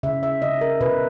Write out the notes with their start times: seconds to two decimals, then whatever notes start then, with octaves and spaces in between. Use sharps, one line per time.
0.03 C#3 E5
0.23 E5
0.42 C#3 D#5
0.61 A#4
0.81 B2 B4